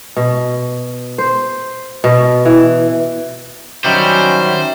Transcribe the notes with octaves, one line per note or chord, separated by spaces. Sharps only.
B2
C5
B2
E3
D#3 F#3 G3 C#4 F#4 C5 E5